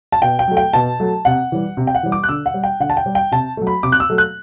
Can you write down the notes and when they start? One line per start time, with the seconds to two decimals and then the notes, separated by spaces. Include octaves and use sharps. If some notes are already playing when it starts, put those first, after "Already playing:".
0.12 A5
0.22 B2 G5
0.39 G5
0.48 F#3 A3
0.57 G5
0.73 B2 A5
1.00 F#3 A3
1.25 C3 F#5
1.52 E3 G3
1.77 C3
1.87 G5
1.95 F#5
2.03 E3 G3
2.12 D6
2.23 F#6
2.29 D3 E6
2.46 F#5
2.54 G3
2.64 G5
2.80 D3 F#5
2.90 A5
2.97 G5
3.06 G3
3.15 G5
3.32 C3 A5
3.57 F#3 A3
3.67 B5
3.83 C3 D6
3.92 F#6
4.00 E6
4.10 F#3 A3
4.18 F#6